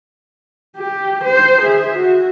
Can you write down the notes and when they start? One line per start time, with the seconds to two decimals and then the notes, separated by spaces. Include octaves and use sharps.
0.77 G4
1.24 C5
1.62 G#4 E5
1.95 F#4